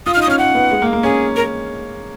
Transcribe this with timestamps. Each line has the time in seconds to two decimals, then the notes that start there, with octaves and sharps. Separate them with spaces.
0.06 F4 D#6
0.14 F6
0.17 D#4
0.22 D#6
0.27 C#4
0.30 F6
0.38 C#4 F#5
0.55 B3
0.71 G#3
0.82 A#3
0.93 A#3
1.03 C#4 G#4
1.36 A#4